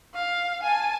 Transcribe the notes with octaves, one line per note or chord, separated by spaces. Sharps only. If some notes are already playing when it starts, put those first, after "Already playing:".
F5
G#5 A5